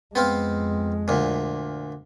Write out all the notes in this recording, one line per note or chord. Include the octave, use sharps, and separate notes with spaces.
F2 G#3 B3 C4 F5
D2 A#2